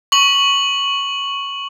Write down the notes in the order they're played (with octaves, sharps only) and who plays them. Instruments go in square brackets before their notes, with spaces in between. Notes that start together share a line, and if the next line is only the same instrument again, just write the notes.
[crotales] C#6 F#7